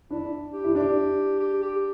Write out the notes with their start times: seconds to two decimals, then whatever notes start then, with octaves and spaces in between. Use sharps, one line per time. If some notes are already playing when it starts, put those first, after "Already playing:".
0.10 D4 E4
0.53 G4
0.64 E4
0.75 D4 G4
1.40 G4
1.62 G4